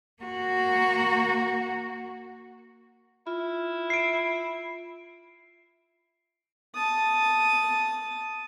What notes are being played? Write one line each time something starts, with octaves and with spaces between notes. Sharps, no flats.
A#3 F#4
E4 F4
C7 D7
A5 D#6